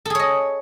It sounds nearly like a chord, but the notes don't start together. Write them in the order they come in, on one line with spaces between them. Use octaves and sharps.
A4 G#4 C#5 D#5